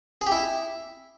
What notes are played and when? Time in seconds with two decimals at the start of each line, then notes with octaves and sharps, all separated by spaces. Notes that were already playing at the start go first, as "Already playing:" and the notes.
0.21 G#4
0.27 G4
0.32 E4